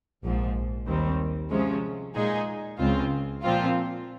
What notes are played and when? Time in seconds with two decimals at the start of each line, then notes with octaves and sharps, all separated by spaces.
0.23 A#1 G#2 F3
0.88 D#2 D#3 G3 C4
1.51 C3 F3 G#3 C#4
2.15 A#2 G#3 D#4 G#4
2.79 C#2 C#3 G#3 C4 F4
3.43 A#2 F3 C4 F4